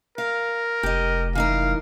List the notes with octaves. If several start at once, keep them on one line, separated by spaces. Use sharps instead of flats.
A#4 F5
F1 G4 D#5
E3 D#4 A#4 F5